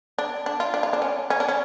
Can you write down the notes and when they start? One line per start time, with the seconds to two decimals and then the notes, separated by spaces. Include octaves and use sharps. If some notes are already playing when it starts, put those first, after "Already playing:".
0.19 D4
0.46 D4
0.60 F4
0.74 D4
0.83 F4
0.93 D4
1.02 C#4
1.30 C#4
1.40 D4
1.49 C#4